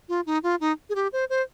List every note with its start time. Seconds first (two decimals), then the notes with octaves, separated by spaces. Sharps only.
0.09 F4
0.26 D#4
0.43 F4
0.60 D#4
0.89 G#4
0.95 G4
1.13 C5
1.30 C5